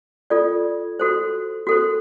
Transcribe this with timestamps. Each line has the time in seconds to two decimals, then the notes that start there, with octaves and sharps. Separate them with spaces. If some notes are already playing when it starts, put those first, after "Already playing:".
0.30 F4 A4 D5
0.99 F#4 A4 C5
1.67 F#4 A4 C5